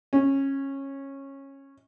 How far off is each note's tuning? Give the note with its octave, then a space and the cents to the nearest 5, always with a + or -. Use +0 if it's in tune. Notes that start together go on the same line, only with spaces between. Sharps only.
C#4 -20